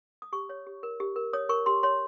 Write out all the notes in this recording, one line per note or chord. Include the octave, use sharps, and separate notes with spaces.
D#6
G4 C#6
C#5
G4
A#4
G4
A#4
C#5 D#6
A#4 C#6
G4 C6
C#5 C6